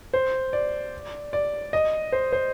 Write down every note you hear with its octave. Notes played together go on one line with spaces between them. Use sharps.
C5
D5
D5
D#5
C5
C5